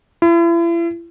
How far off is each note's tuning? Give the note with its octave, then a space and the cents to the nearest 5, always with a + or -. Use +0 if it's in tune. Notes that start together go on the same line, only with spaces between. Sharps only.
E4 +40